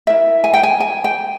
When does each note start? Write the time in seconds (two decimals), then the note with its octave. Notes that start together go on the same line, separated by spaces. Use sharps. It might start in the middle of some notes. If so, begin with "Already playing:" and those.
0.07 E4 A#4 E5
0.44 G#5
0.54 G5
0.63 G#5
0.80 G#5
1.04 G5